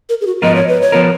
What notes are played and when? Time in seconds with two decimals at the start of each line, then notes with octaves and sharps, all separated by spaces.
0.09 A#4
0.21 G#4
0.27 F#4
0.42 G#2 F3 B3 F4 A#4 D#5
0.56 C#5
0.68 B4
0.82 C#5
0.92 F3 B3 F4 A#4